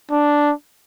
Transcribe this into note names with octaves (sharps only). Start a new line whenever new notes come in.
D4